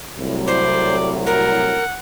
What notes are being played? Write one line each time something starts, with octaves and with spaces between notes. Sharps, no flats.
C2 A2 F#3
C5 D5
A#4 F#5